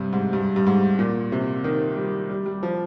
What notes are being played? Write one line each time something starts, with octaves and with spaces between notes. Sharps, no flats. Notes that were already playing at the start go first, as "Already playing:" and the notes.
Already playing: G2 C3
G#2
G2
G2
G#2
A#2
C3
D#3
G3
G3
G3
F3